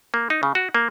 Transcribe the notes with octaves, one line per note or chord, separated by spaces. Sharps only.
A#3
D#4
C#3
F#4
A#3